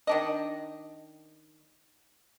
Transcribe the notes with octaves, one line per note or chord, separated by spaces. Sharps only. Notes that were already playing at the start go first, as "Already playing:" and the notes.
D#3 D4 D#5